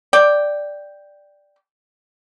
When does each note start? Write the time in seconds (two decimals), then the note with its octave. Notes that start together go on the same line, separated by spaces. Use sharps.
0.13 D5 G5